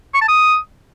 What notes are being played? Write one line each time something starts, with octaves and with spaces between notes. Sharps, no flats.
C#6
A5
D#6